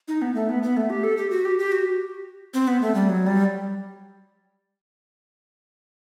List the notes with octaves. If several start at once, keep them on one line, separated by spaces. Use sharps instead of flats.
D#4
B3
A3
B3
B3
A3
G4
A4
G4
F#4
G4
G4
F#4
C4
B3
A3
G3
F#3
G3